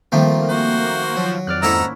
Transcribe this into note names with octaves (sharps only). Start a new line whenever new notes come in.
D#3 F3 G3 A3 A#3 C4
F#4 C5
F3 F#3
F2 D5 F6 F#6
G#2 A#3 C#4 E4 A4 F#5 A#5 E6